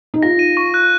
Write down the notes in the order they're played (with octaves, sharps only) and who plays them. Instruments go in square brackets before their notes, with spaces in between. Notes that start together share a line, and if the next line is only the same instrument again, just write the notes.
[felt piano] D#4
[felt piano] F4 [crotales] A#6
[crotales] D#7
C#6
F#6